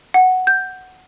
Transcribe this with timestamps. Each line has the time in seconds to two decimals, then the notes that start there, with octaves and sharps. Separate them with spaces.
0.14 F#5
0.47 G6